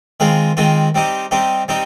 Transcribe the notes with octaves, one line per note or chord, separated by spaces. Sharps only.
D#3 G#3 C4 F4
D#3 G#3 C4 F4
G3 C4 D#4 G4
G3 C4 D#4 G4
G3 C4 D#4 G4